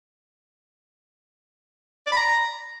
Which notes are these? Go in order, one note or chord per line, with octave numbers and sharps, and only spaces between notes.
D5
B5
A#5